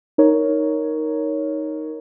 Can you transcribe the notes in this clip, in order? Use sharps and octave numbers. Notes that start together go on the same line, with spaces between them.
D#4 A#4 C#5